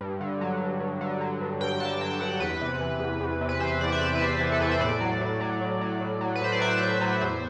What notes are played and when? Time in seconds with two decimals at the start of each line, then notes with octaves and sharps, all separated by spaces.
0.01 G2
0.21 D3
0.41 F#3
0.61 G2
0.80 G2
1.01 D3
1.21 F#3
1.41 G2
1.61 G2 G5
1.72 G5
1.80 D3 A5
2.01 F#3 G5
2.21 G2 F#5
2.40 E2 B4
2.61 C3
2.81 E3
3.00 E2
3.21 E2
3.41 C3
3.49 B4
3.60 E3 C5
3.81 E2 D5
3.92 E5
4.01 E2 D5
4.15 B4
4.21 C3 C5
4.41 E3
4.52 A4
4.61 E2 B4
4.71 C5
4.81 A2 D5
5.01 F#3
5.21 A2
5.40 F#3
5.61 A2
5.81 F#3
6.01 A2
6.21 F#3
6.35 B4
6.41 A2 C5
6.52 D5
6.61 F#3 E5
6.81 A2
7.01 F#3
7.21 E2 C5